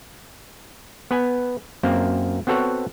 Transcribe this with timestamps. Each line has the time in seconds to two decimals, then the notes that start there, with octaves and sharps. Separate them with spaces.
1.11 B3 B4 G#5
1.83 F#2 A#3 C4
2.47 B3 C4 F#4 A4 C#5 F#5